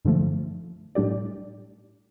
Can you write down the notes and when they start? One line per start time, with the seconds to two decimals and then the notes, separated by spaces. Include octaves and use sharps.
0.05 G2 D3 F3 A3
0.95 A2 G3 D4 G4 D5